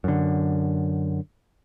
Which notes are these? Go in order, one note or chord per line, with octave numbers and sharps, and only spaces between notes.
F#2 D3